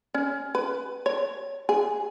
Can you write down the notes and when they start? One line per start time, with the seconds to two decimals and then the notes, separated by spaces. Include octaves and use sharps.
0.14 C#4
0.55 B4
1.06 C#5
1.69 G#4